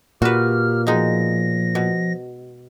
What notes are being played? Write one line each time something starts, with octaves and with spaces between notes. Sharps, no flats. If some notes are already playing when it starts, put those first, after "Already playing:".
A#2 F#4 G4 B4 F6
B2 F3 G#3 D#4 A#6
B2